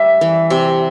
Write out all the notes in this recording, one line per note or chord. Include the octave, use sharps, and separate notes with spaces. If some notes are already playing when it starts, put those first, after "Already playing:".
Already playing: G3 E5
E3
C3